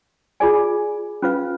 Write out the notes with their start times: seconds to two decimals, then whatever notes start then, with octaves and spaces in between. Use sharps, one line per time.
0.40 F4 G#4 D5 G#5
1.22 C#4 F4 B4 F5